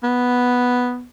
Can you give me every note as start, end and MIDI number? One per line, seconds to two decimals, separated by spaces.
0.04 1.04 59